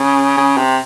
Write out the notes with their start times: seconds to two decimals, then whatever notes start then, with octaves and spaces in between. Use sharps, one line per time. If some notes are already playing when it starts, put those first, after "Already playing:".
Already playing: C#3
0.37 C#3
0.57 C3